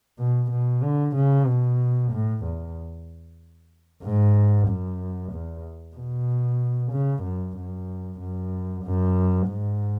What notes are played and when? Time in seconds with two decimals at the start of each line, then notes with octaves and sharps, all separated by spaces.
0.19 B2
0.51 B2
0.83 D3
1.16 C#3
1.47 B2
2.12 A2
2.44 E2
4.04 G#2
4.67 F#2
5.32 E2
5.96 B2
6.92 C#3
7.23 F#2
7.56 F#2
8.20 F#2
8.84 F#2
9.48 G#2